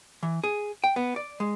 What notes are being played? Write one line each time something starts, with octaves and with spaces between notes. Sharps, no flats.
E3
G#4
G5
B3
D5
G#3